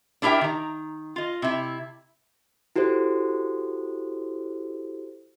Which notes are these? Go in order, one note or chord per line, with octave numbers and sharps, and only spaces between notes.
D4 E4 G4 A#4 E5 G5
D#3 A#5
F4 D#5
C3 E4
E4 F#4 G4 A4 C5